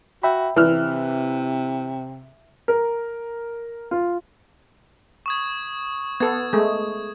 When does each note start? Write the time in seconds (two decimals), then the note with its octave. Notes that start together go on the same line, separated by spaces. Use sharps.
0.23 F#4 E5 G5 B5
0.56 C3 E3 E5 F6
2.68 A#4
3.91 F4
5.26 C#6 D#6 G#6
6.20 B3 A4 G#6
6.53 G#3 A3